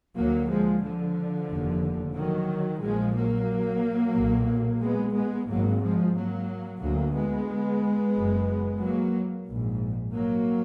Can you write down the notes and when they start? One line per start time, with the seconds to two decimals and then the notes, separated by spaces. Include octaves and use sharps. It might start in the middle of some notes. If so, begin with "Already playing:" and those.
0.16 D2 F#3 A#3
0.50 F3 G#3
0.82 D3 F3
1.49 F1 D#2
2.15 D#3 F#3
2.82 A#1 A#2 F3 G#3
3.16 F#3 A#3
4.15 B1 A#2
4.82 G#3 B3
5.15 G#3 B3
5.48 G#1 G#2 F#3 A#3
5.82 F3 G#3
6.15 F#3 A#3
6.81 D2 F#3 A#3
7.14 G#3 B3
8.15 F#1 F#2
8.81 F#3 A#3
9.47 A#1 G#2
10.14 F#3 A#3